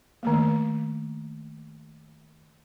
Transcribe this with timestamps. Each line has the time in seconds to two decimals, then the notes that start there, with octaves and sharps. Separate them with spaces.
0.23 D#3 A3 A#3